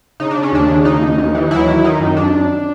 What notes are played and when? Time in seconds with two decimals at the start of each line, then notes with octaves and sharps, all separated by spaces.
0.20 C#3 D#4
0.31 C#3 D4
0.43 C#4
0.52 D#2 D4
0.68 C#3
0.85 D#2 D#4
1.02 D#2
1.18 D#2
1.35 E3
1.51 F#3 E4
1.68 D#3
1.84 D#3 D#4
2.00 F#2
2.17 F#2 D4
2.33 F#2